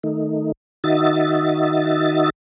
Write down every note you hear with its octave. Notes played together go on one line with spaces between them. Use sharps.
D#3 A3 D#4
D#3 D#4 F#4 D#5 E5 A6